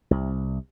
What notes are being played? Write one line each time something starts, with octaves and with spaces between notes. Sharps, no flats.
C2